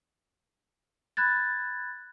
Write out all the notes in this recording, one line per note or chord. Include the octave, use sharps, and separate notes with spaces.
B5 F#6 G#6 A6